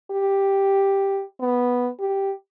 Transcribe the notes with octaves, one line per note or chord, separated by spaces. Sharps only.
G4
B3
G4